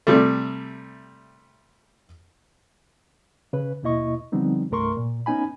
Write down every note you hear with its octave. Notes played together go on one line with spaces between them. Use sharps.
C3 G3 A3
C#3 B4
D#2 B2 A#3 E4 D#5 C#6
D3 F3 G3 B3 C4 D#4
C2 G2 A3 A#4 C6 C#6
A#2
B3 C#4 D#4 G#5 B5